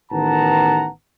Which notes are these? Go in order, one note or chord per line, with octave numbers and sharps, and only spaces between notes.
A1 D#3 B3 F#5 A5 A#5